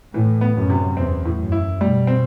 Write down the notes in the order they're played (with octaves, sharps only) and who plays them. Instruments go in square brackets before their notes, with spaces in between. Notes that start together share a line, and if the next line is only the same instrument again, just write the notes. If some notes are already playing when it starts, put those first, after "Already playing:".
[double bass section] A2 [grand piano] E3
[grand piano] B3
[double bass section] F#2
[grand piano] C3
[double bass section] E2 [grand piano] C4
[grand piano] A2
[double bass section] F#2
[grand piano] E4
[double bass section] B2 [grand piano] G3
[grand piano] C4